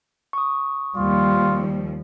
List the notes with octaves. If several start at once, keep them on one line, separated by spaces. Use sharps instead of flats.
C#6 D#6
D#2 F3 G3 F4